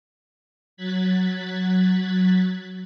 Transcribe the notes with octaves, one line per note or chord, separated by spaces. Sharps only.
F#3 F#6 G#6 A6 B6